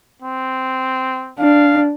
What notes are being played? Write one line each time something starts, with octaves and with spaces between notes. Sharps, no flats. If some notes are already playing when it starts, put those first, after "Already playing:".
C4
D4 F5